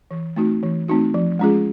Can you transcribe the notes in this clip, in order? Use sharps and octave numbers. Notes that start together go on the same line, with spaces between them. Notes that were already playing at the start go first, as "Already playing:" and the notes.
E3
A3 C4 D#4 F#4
E3
A3 C4 D#4 F#4
F3
G#3 C#4 F4 G#4